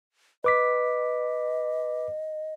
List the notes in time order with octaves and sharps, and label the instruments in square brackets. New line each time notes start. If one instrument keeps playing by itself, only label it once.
[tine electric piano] B4 D6 B6 [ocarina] D#5